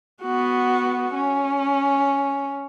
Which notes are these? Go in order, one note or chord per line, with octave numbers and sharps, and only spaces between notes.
B3 F#4
C#4